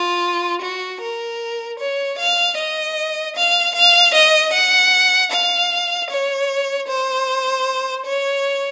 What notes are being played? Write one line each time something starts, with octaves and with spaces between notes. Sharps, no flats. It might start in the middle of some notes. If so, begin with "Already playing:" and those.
Already playing: F4
F#4
A#4
C#5
F5
D#5
F5
F5
D#5
F#5
F5
C#5
C5
C#5